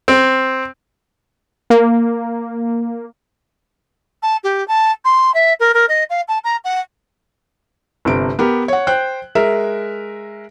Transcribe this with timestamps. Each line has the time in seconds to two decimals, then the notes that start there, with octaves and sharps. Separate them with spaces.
0.08 C4
1.70 A#3
4.22 A5
4.43 G4
4.67 A5
5.04 C6
5.34 E5
5.59 A#4
5.74 A#4
5.88 D#5
6.09 F5
6.28 A5
6.44 A#5
6.64 F#5
8.05 G1 C3 D7
8.39 B3 G4 A#4
8.68 C#5 F#5
8.87 C5 G5 F#6
9.35 G#3 A#4 E5